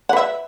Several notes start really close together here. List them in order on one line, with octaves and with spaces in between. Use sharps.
F#5 B4 E5